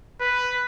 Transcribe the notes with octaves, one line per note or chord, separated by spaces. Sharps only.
B4